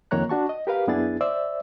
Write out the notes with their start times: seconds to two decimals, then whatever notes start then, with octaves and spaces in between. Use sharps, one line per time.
0.11 F2 D#3 A#3 C#5 A#5 F#6
0.29 D4 F#4 A5 C#6
0.49 D#5
0.67 G4 A#4 B4 F5
0.87 F#2 B3 D4 E4 G#4 A6
1.21 C5 D5 E5 E6